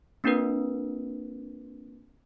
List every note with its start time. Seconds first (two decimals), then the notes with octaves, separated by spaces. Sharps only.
0.24 A#3 C4 D4 F4 A#4 B4